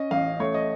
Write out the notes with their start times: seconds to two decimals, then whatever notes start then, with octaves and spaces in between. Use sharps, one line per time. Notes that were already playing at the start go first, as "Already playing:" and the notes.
Already playing: C#4 D#5
0.11 A1 F5
0.40 A3 C#5
0.54 D#5